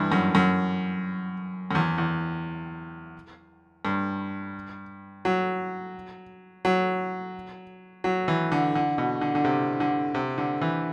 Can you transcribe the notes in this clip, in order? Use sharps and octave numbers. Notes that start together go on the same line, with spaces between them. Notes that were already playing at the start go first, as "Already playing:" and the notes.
Already playing: G2 E3
F#2
F#2
F#2
E2
E2
G2
F#3
F#3
F#3
E3
D3
D3
B2
D3
D3
C3
D3
C3
D3
E3